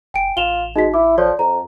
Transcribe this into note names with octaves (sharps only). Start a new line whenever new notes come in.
F#1 G5 G#5 D7
A1 F4 E7 F7 G7
G#3 D#4 F#4 B6
E4 D6
F3 A4 C#5 D5
F2 A#5